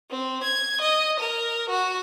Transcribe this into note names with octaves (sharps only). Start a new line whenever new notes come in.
C4
G#6
D#5
A#4
F#4